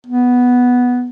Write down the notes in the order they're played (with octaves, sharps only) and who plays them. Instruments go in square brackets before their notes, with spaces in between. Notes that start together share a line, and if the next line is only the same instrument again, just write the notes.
[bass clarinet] B3